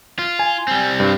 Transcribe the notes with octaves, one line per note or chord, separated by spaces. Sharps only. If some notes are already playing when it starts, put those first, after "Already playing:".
F4
G#5
G3 C4
G2